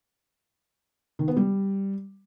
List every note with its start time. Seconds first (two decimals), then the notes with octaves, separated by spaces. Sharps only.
1.19 D#3
1.28 B3
1.37 G3